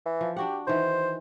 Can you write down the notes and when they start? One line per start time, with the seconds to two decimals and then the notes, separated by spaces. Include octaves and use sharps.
0.06 E3
0.21 F3
0.37 D4 F#4 G4 F#5
0.67 D#3 E3 C5